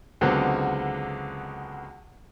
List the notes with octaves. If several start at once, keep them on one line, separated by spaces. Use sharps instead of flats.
C#2 D3 F#3 G#3 B3 C4